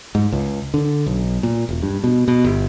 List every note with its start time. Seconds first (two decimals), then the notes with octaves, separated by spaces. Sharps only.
0.15 G#2
0.32 C#2
0.74 D3
1.06 B1
1.43 A#2
1.69 E1
1.82 G2
2.04 B2
2.28 B2
2.44 G1